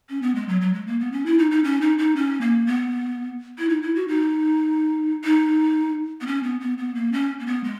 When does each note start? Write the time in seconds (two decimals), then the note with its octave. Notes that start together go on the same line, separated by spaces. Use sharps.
0.10 C#4
0.22 B3
0.35 G#3
0.48 F#3
0.61 F#3
0.74 G#3
0.87 A#3
1.00 B3
1.12 C#4
1.26 E4
1.39 D#4
1.51 D#4
1.64 C#4
1.81 D#4
1.98 D#4
2.16 C#4
2.41 A#3
2.67 B3
3.59 E4
3.70 D#4
3.82 E4
3.95 F#4
4.08 D#4
5.24 D#4
6.21 B3
6.27 C#4
6.44 B3
6.61 B3
6.78 B3
6.95 A#3
7.12 C#4
7.40 A#3
7.46 B3
7.64 G#3